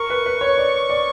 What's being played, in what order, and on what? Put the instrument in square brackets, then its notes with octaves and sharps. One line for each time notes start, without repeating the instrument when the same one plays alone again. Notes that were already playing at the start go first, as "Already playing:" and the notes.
Already playing: [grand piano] A#4 [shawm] C#6
[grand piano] B4
B4
C#5
D5
D5